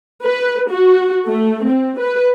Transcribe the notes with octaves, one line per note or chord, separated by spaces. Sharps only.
B4
F#4
A3
C4
B4